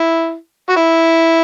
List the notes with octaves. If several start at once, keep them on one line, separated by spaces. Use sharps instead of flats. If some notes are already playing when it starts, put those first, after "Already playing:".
Already playing: E4
F#4
E4